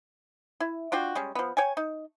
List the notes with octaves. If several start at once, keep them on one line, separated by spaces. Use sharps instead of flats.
E4
D4 F4 F#4 G5
G3 G#3 C#4
F3 B3
C#5 G5 G#5
D#4